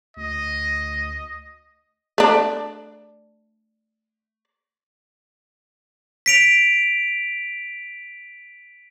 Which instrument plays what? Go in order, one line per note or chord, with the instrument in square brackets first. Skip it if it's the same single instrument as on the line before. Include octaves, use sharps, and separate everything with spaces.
[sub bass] D2 [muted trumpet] D#5
[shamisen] A3 D4
[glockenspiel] B6 D7 F7